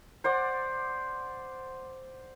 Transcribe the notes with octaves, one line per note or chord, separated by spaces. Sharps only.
C5 D5 F#5